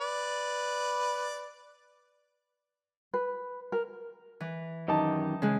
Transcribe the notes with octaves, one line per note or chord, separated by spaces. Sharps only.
B4 D5
B4
A#4
E3
F#2 D#3 D#4 G4 A5
C#3 G#3